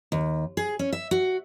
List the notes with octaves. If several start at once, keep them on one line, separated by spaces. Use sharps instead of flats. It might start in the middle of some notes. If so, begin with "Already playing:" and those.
D#2
G#4
C#4
E5
F#4